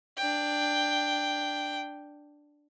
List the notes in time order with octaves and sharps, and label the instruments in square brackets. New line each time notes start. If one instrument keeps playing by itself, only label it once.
[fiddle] D4 G5